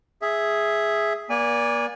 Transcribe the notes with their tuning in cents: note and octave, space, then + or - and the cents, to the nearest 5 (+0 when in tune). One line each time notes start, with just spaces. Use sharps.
G#4 +0 E5 +0
A#3 +40 D5 -15 G#5 -20